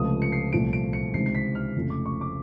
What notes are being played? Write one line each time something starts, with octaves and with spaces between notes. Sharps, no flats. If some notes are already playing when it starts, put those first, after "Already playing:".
Already playing: C#2 C3 F3 A3 D#6
C#7
C7
C2 A#2 F3 A3 D7
D7
C#7
C#2 C3 D#3 G#3 C7
C7
B6
F6
F1 F2 C#3 F3 A3
D6
C#6
D6